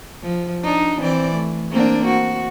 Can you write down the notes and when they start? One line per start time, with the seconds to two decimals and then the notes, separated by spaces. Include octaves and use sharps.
0.23 F3
0.63 D4 D#4
1.01 E3 C4 D5
1.35 A3
1.71 A#3 C4 D4
2.06 F#4